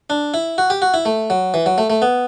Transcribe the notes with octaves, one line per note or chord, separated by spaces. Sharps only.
D4
E4
F#4
G4
F#4
E4
A3
F#3
E3
F#3
A3
A3
B3